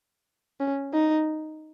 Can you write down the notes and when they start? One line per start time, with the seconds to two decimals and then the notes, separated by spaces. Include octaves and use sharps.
0.60 C#4
0.94 D#4